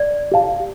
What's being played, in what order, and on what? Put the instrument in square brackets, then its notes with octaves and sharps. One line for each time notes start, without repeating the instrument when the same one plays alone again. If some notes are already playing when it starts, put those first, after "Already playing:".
Already playing: [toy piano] D5
[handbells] G4 F5 A5